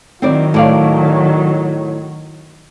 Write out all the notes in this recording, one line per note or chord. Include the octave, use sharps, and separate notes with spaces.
D#3 F#3 C4 E4 D5
A2 D5 F5